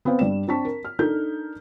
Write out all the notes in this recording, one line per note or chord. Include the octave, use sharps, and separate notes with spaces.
B3 C4 B4 F5 G5
G2 G3 D5 E7
C4 D4 A5 C#6 B6
A#4
F6
D4 D#4 A4 A#4 G6